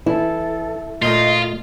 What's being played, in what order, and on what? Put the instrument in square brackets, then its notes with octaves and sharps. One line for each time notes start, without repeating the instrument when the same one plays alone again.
[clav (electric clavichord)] E3 [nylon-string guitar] E4 [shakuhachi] A4
[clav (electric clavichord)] A#2 A3 [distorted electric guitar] F4 [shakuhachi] D#5